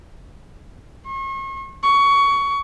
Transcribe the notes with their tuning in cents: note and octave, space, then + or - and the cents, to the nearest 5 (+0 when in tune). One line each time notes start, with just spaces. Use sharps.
C#6 -40
C#6 +20